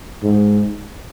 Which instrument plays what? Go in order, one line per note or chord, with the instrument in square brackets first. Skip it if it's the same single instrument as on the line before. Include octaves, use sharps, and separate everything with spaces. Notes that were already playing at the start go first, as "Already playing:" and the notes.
[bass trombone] G#2